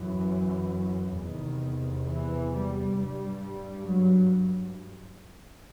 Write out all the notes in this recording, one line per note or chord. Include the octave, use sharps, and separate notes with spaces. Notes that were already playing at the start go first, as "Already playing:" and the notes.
Already playing: F#2 E3
E2 C3 D#3
E3
G3
G2 G3
F#3